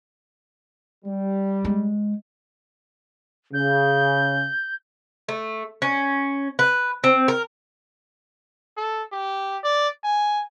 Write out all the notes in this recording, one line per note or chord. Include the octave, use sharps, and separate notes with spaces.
G3
G#3
C#3 G6
A3
C#4
B4
C4
A#4
A4
G4
D5
G#5